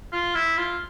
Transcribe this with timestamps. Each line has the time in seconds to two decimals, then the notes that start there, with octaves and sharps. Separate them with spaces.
0.13 F4
0.35 E4
0.57 F4